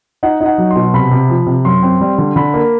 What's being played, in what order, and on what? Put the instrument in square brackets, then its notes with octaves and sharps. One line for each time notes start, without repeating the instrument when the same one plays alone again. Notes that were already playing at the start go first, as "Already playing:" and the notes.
[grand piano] D#4 F#5
D#4
F#5
F#3
C6
B2
C3 B5
C3
F3
C3
F#2 C6
C4
G3
D3
D3 B5
A#3